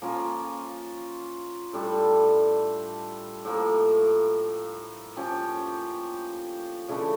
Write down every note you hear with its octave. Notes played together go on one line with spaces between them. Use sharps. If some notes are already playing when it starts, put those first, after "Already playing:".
F3 A#3 C#4 F4
A2 G3 D4 A4
A2 F3 A#3
F3 C#4 G4
C#3 E3 A3 D4